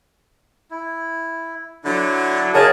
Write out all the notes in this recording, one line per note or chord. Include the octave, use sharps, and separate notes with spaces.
E4
D3 F#3 D4 E4
C#3 F#3 D#4 G#4 A#4 A5